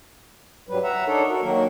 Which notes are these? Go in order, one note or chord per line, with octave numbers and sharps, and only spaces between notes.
G2 F#3 G3 B4
E5 F#5 A#5
D4 D#4 A4 A#4 C#5
F#4 A#4
D#3 F#3 A#3 F#4 A#4